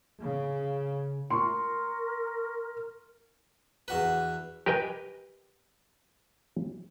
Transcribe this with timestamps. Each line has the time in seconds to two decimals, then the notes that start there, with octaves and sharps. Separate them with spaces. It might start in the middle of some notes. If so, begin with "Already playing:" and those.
0.22 C#3
1.30 A#4 C6 C#6
3.88 E2 F#4 B4
4.66 G4 A#4 B4 D#5 G5 G#5